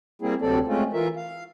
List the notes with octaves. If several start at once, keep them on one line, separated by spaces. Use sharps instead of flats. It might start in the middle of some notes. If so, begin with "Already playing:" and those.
G3 A#3 C4 E4 G#4
D2 C3 F#3 C4 A4 D5
G#3 A3 C4 C#4 F4
E3 F4 A#4 E5
F5